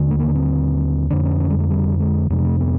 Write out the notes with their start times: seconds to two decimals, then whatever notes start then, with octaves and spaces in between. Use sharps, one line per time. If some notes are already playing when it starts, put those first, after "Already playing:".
Already playing: D#2 D3
0.11 A3
0.20 A#3
0.35 C4
1.10 F2 D3 D4
1.25 C#4
1.40 C#4
1.50 G3
1.60 G#3
1.70 G3
2.00 G#3
2.30 F2 C3 G#3
2.45 A3
2.60 B3